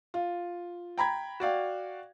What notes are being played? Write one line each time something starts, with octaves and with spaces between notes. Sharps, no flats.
F4
G5 A#5 B5 G#6
F#4 D5 F5 G5